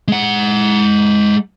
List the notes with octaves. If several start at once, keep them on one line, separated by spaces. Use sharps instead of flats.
G#3 F#5